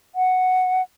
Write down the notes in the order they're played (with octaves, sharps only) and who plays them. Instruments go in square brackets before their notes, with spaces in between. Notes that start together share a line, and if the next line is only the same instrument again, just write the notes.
[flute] F#5